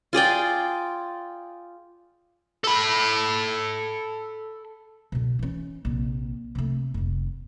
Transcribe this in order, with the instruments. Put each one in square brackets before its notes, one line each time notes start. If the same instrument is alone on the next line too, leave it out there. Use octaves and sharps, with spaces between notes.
[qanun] F4 G#4 D5 G5
[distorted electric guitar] A4 B5
[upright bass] B2 D3
E3 C#4
A#1 C3
C3 A3
F1 D#2